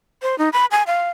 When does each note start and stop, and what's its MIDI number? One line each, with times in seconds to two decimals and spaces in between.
0.22 0.37 72
0.38 0.49 63
0.53 0.65 83
0.71 0.83 80
0.87 1.10 77